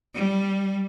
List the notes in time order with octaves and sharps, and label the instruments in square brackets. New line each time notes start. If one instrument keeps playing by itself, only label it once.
[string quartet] G3